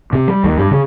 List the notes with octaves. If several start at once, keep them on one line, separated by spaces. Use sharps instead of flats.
C3
G3
D#2
G2
C#3